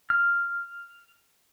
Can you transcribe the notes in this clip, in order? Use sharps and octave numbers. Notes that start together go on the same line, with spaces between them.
F6